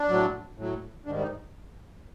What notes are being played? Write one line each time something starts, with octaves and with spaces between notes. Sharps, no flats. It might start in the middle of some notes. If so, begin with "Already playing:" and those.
Already playing: D4
A2 F#3
A2 F#3
G#2 D#3 G3 D4
D#4